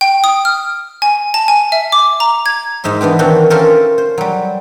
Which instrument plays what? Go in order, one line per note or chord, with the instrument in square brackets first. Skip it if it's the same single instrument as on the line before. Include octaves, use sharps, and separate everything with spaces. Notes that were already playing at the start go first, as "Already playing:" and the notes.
[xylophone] G5
D#6
F6
G#5
A5
G#5
E5
D6
A#5
G#6
[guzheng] G#2 D#4 E5 C6
E3 B3 D4 G4
D#3 E3 C4 D4 F#4
C#4 F4 G4 A4 A#4 C5
C5
F#3 G3